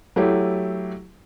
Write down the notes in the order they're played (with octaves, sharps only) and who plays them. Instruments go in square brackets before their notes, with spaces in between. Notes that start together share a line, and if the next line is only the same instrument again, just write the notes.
[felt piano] F#3 A3 E4 G4